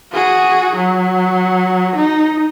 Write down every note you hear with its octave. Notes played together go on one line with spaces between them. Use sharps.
F#4 G#4
F#3
D#4